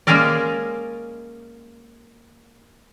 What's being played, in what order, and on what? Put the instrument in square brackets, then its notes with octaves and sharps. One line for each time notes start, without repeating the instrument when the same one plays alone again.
[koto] G#3 A#3 C#4 G#4 A#4 D5